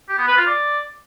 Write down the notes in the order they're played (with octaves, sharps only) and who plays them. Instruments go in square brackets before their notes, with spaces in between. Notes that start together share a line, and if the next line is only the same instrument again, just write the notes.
[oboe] G4
B3
B4
F4
D5